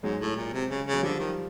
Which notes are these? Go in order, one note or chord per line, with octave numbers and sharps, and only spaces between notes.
G#2 F#3 G#3
A2
A#2
C3
C#3
C#3
F#3
D3 F3 G3
D#3